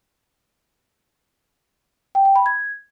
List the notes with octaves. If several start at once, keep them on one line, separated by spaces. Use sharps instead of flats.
G5
G5
B5
G#6